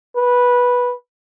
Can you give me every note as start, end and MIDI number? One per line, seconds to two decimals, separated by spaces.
0.16 0.94 71